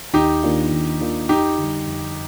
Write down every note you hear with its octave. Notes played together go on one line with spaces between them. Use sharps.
D#2 D#4 G4
D#3 A#3 D4 F4
D#2
D#3 A#3 D4 F4
F2 D#4 G4
D3
G3
F2